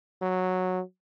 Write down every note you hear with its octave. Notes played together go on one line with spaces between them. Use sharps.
F#3